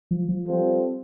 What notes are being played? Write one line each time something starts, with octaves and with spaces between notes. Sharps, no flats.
F3
F3
G3 C4 F4 A4 C5